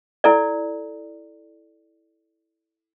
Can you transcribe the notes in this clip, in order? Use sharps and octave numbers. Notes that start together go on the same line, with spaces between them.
E4 A4 D5